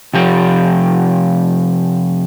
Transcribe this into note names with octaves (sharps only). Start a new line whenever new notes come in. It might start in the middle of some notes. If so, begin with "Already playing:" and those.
C3 F3 G4